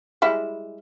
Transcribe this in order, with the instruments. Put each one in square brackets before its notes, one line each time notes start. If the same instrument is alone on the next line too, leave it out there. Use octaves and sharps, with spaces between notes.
[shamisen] G3 G#3 E4